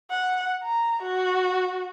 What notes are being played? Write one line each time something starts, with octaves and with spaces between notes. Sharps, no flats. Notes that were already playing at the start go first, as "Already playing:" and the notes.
F#5
A#5
F#4